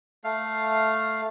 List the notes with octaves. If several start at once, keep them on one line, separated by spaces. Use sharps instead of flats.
A3 F5